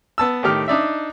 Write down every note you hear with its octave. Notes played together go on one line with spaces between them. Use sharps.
B3 A5 E6
A2 D#3 G4 F6
D4 D#4 D5 E5